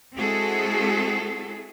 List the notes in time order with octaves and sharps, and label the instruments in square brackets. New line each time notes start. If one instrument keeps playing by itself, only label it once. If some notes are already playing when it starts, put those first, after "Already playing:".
[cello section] G#3 C4 E4 F#4 G#4 A4